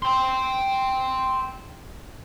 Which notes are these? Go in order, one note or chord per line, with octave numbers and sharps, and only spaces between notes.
G5 C6